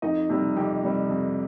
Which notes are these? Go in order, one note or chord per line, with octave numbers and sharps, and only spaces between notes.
F2 D#4 D#5
C3 G3
F2 G4
C3 G3
F2